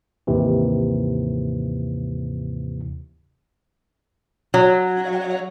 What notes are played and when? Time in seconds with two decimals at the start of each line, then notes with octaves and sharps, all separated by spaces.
0.27 D#2 G#2 C3 E3
4.54 F#3